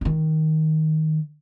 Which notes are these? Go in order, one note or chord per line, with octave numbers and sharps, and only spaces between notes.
D3
D#3